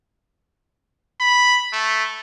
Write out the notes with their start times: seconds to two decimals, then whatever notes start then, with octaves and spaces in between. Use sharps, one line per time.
1.20 B5
1.73 A3